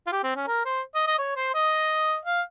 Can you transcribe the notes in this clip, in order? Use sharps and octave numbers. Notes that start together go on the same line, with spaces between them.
F4
G4
C4
C#4
A#4
C5
D#5
D#5
C#5
C5
D#5
F5